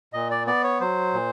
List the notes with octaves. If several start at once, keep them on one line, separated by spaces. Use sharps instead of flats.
A#2 D#5
D5
B3 D5
C#5
F#3 C5
A#2